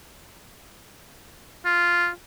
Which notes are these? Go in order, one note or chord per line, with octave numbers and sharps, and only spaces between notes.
F4